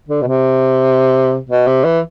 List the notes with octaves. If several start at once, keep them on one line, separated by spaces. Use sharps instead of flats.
D3
B2
C3
B2
C3
E3